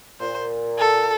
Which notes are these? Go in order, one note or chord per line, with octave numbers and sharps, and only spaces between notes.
A#2 C5
A4